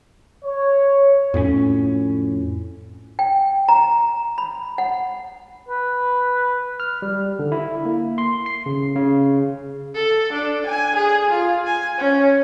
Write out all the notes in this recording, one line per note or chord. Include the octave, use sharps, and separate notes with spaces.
C#5
F2 A2 B3 C#4
G5
A#5
B5
F#5
B4
F6
G3
D3
E4
A#3
C6
C7
C#3
C#3
A4
D4
G#5
G#4
F4
G#5
C#4